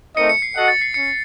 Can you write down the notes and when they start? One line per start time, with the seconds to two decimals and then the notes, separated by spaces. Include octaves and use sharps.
0.16 A3 C4 D#4 A#4 D#5 C#7
0.29 C#7
0.42 C7
0.56 F#4 A4 D#5 F#5
0.68 A6
0.81 C7
0.94 C#4 C#7